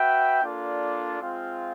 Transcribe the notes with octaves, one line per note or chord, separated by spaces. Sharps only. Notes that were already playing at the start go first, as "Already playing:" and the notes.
Already playing: F#4 B4 E5 G5
A#3 D4 F4 A4 D5
G#3 C4 F4